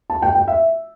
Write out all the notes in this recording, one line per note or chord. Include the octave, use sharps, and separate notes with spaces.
A5
G5
G5
E5